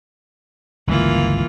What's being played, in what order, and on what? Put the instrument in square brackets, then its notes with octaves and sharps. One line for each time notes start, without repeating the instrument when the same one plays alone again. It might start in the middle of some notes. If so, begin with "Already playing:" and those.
[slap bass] G1 C#2 [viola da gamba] E3 A#3 F4